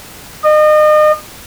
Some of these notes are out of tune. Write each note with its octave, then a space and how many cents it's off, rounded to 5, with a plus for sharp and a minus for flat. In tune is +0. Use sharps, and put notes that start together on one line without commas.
D#5 -35